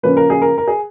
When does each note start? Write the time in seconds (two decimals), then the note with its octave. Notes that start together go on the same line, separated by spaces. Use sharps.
0.03 C#3 F3 A#3 C#4 B4
0.17 A#4
0.30 G#4
0.42 A#4
0.58 A#4
0.68 G#4